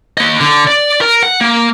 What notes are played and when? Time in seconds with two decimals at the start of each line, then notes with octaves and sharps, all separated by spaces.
0.18 A#3 D#5
0.41 D3
0.67 D5
1.01 A#4
1.23 F#5
1.41 A#3